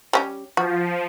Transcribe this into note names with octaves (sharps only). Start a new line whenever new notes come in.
G3 C#4 G4
F3 F#4